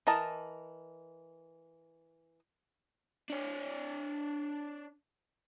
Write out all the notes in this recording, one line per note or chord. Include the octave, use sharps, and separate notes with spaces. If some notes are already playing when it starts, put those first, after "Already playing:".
E3 A#4 D#5 A5
D4 C#5